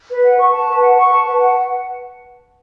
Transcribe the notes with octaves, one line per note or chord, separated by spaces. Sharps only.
B4
F#5
C#6
A5
B4
F#5
C#6
A5
B4
F#5